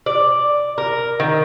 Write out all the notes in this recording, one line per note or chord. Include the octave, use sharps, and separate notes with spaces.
D5
A#4
D#3